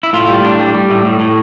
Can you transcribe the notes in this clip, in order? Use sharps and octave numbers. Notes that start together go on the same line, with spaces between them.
E4
A2 F4
G3
A2 D4
G3
G3
A2
A2
A2